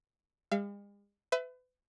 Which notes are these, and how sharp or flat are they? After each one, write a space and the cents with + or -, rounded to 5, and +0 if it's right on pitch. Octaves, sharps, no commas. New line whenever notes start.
G#3 -45 F5 -35
B4 +35 E5 +0